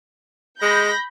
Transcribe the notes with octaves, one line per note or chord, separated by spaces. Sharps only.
G#3 B5 G6 A#6